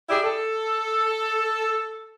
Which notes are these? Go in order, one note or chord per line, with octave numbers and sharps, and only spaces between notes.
E4 G4 G#4 D5
A4